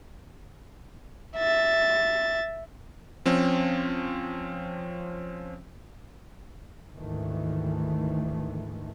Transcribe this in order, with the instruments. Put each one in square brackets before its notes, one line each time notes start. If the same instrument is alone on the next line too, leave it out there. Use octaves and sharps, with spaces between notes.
[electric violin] E5 A6
[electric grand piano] F3 C4 C#4
[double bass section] D2 G#2 D#3 E3 A3